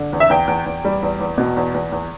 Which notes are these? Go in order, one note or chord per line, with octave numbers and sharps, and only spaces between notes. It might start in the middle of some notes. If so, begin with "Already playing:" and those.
Already playing: D3
E2
E5
E2 G5
E2
E2
G3
E2
E2
B2
E2
E2
E2